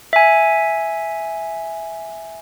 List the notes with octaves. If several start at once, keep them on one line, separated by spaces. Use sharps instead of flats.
E5 G#5